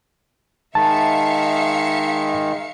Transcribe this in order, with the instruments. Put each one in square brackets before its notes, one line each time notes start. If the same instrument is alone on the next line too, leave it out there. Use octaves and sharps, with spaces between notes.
[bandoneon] D#3 G#3 [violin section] E5 F5 C#7 [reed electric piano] A5